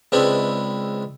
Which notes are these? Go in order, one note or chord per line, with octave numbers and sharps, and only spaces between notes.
C#2 G#3 C4 D4 E4 B4